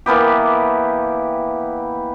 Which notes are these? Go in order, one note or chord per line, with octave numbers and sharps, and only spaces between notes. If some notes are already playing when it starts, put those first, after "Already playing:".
E3 A#3 B3 G4